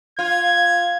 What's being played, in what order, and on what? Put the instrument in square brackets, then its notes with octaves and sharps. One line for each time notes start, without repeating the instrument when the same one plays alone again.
[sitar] F4 [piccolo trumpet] G#6